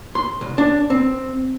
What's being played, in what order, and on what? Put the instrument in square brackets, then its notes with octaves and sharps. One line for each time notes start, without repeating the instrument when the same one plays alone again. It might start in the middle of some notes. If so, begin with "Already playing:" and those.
[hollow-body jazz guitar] C6
C2
D4
C4